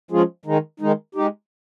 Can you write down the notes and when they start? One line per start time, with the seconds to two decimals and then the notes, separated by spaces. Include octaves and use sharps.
0.11 F3 G#3 C#4 F4 G#4
0.45 D#3 G#3 D#4
0.80 D#3 G#3 D#4
1.15 G#3 D#4 G4